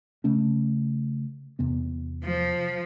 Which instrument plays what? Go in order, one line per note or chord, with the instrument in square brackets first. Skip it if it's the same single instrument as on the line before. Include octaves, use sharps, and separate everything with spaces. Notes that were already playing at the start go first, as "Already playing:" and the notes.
[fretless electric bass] C#3 A3 C#4
E2 C3 B3
[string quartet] F3